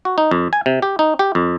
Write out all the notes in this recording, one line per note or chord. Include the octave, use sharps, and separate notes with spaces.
F#4
D#4
F2
G#5
C3
G4
D#4
G4
F2